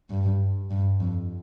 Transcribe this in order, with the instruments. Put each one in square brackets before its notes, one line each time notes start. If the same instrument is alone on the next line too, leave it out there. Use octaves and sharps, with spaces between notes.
[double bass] G2
G2
F2